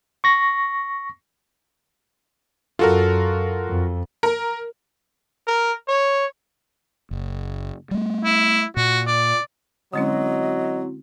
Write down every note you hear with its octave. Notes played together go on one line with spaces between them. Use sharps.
C#6 A#6
F#2 F4 F#4 A4 A#4
F2
A#4
A#4
C#5
F#1
G3 A3
E4
A#2 F#4
D5
D3 F#3 G#3 C4 C#4 E4 F#4 D#5